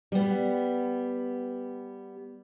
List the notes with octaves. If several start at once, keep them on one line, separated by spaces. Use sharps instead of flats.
G3 B3